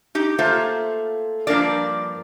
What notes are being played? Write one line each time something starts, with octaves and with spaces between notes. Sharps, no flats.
D#4 G4
A3 A#3 F4 C5 A#5
G2 F3 A#3 D4 A#4 D5